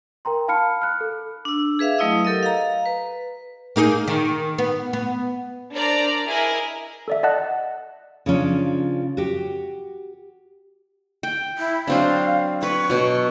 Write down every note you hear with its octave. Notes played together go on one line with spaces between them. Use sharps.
A#4 G5 A#5 C6
F5 A5 B5 F6 C#7
F6 F#6
A4
D4 E6
G#4 B4 E5 F5
F#3 A3 E4 D#5 D#6 E6
G4 A4 A#4 D#5
F5 A#5
B4
A#3 D#4 G#4
D#3
B3
B3
D4 A#4 C5 D5 A#5
E4 G#4 A#4 D#5
A4 D5 E5
D5 D#5 F#5 A5 F#6
C#3 F3 C#4 D4
F#4 G4
G5
E4
F#3 C4 D4 F5
B4 C#6
B2 F#3